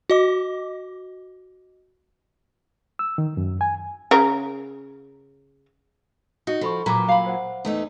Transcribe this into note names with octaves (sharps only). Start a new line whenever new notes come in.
F#4 D#5 D6
E6
D#3
F#2
G#5
C#3 A#4
D#4 F#4
F3 A4 B5 C#6
A#2 F#3 B4 A#5 D6
F5 B5
C5 F#5
E2 A3 D#4